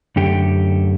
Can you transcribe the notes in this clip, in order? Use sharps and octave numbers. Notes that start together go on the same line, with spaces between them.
F#2 D3 A3 G4